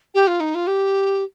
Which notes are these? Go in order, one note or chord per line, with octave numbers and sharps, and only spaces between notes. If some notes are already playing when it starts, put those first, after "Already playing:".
G4
F4
D#4
F4
G4